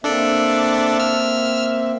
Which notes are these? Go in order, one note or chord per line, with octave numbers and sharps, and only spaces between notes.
A#3 C4 D4 A4 D5 E5
E6 F6